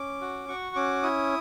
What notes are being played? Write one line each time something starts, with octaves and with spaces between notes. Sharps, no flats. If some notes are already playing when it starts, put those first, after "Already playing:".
Already playing: C#4 D6
F#4
F#4 C#6
C#4 D6
E4 D#6